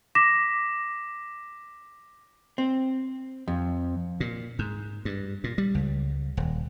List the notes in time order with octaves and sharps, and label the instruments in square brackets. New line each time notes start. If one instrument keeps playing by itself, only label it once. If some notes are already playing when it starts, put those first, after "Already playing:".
[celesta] D6 A#6 B6 E7
[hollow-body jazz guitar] C4
F2
[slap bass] A#2
G#2
G2
A#2
G3
C#2
D#1